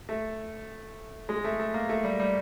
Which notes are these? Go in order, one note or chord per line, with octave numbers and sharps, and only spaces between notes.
A3
G#3
A3
A3
A#3
A3
G3
G3